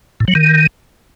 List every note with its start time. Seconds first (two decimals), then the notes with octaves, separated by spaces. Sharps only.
0.20 A2
0.28 F#3
0.35 D#3